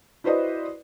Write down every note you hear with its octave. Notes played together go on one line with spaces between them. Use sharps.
E4 F#4 B4 C5 D5 D#5